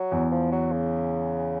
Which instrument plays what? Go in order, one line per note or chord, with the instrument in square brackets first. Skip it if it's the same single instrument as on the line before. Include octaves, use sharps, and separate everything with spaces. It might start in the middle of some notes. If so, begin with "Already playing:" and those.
Already playing: [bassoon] F#3
[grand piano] E2
[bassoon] F3
F#3
C#3